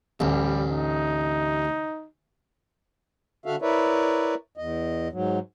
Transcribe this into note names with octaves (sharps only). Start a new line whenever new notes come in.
A1 D2 G3
D#4
D3 F#4 A4 E5 F5
E4 A#4 B4 C#5 D5 E5
E2 D#5
G#2 F#3